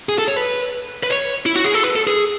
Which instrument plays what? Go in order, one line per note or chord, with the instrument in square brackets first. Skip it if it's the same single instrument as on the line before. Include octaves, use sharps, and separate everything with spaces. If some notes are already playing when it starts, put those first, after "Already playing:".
[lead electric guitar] G#4
A4
C#5
B4
B4
C#5
E4
F#4
G#4
A4
B4
A4
G#4